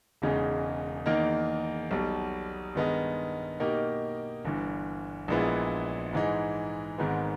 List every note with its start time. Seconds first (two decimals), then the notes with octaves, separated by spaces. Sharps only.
0.22 E1 E2 C#3 G#3 D#4
1.06 E2 D#3 A#3 D#4 A#4
1.91 B1 B2 G3
2.75 G2 D#3 G#3 B3 D#4
3.60 B2 A#3 D#4 G4 A#4
4.45 G1 G2 E3
5.28 A#1 A#2 G#3 B3 E4
6.13 G#2 E3 G#3 D#4
6.98 G#1 G#2 D#3 G#3 B3